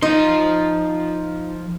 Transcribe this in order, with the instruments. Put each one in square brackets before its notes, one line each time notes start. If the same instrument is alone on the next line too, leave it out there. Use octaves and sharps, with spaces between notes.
[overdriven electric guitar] F3 C6 [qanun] D#4